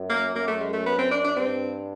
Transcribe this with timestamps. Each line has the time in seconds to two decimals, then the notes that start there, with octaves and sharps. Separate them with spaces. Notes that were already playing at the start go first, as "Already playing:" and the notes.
Already playing: F#2
0.09 A#3
0.35 F#2 A#3
0.48 A3
0.60 G#3
0.73 A3
0.86 B3
0.99 C4
1.11 D4
1.24 D4
1.36 G2 C4